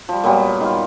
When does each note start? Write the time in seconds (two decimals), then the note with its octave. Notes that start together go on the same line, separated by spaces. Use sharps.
0.09 F3 G3
0.24 A#2 F#3 G3 B3
0.60 D#3 F4